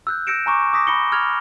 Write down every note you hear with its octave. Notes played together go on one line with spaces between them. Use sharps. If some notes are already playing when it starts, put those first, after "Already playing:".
E6 F#6 G6
E6 G6 A#6 C#7 D7 E7
G#5 A#5 C#6 D6 E6
D6 D#6 A#6 B6
B5 A#6 C#7 G7
B5 F6 G#6 F7